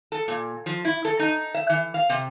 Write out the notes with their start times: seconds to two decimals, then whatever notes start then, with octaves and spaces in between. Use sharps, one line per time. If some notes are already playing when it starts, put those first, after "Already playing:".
0.12 A4
0.28 A#2
0.66 F3
0.85 E4
1.05 A4
1.19 D#4
1.54 E5
1.69 E3
1.94 F5
2.10 C3